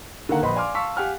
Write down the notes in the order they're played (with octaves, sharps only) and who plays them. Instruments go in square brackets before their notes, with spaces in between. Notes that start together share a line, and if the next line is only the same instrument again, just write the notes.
[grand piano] D3 D#3 A#3 F#5 A#5
A#1 B4 D#5 B5 C6
D5 F5 G#5 C6 D6 F6
F5 A5 C6 C#6 E6 B6
G4 F5 F#5 G#5 F6 F#6